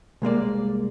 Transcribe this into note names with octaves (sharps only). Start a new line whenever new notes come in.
C2 G#3 A#3 D5